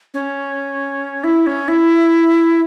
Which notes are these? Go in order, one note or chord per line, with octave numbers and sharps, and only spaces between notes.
C#4
E4
C#4
E4